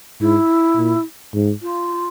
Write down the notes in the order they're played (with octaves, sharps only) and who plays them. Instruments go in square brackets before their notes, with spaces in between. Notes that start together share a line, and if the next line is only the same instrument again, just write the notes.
[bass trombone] G#2 [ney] E4
[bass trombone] A#2
G#2
[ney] F4